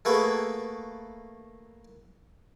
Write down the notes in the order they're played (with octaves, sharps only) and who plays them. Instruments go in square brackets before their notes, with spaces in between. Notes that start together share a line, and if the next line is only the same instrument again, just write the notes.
[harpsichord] A3 A#3 F#4 G#4 A4 B4